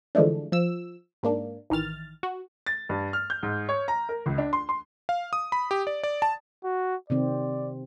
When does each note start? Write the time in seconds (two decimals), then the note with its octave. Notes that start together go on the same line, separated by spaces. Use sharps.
0.15 D3 E3 F3 G#3 A3 D4
0.52 F3 E6
1.23 G#2 A#3 D4
1.70 A1 D#3 E3 F6 A6
2.23 F#4
2.66 A6
2.89 G2
3.13 F6
3.30 G6
3.43 G#2
3.69 C#5
3.88 A#5
4.09 A#4
4.26 C#2
4.38 D4
4.53 C6
4.69 C6
5.09 F5
5.33 D#6
5.52 B5
5.71 G4
5.87 D5
6.03 D5
6.22 A5
6.64 F#4
7.10 C3 D#3 C4 D5